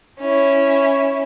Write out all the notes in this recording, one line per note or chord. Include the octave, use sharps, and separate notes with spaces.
C#4 E4